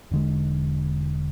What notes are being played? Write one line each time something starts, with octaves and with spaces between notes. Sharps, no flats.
E1 D3 G#3